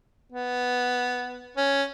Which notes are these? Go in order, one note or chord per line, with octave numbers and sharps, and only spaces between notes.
B3
C#4